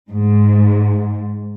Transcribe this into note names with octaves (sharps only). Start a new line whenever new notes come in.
G#2